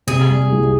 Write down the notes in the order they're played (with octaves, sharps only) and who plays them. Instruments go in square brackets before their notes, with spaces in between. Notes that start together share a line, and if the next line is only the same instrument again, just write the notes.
[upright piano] C3 [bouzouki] G#4
[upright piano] G3
C2